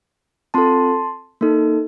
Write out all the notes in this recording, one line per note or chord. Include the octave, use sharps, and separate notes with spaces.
C4 F4 A4 A5 C6
A#3 D#4 A4